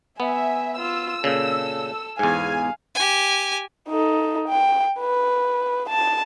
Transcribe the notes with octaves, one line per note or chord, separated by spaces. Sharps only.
B3 E5 G#5
F4 E6
A#2 C#3 A4
E2 G#2 F5 G#5
G4 G#5
D#4 A4
G5
B4
A5